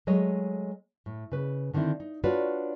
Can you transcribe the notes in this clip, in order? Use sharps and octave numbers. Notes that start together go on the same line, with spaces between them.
F#3 G#3 A3 C#5 D#5
A2
C#3 B4
D3 D#3 C4 D4 E4
D#4
D4 F4 F#4 B4 C#5 D5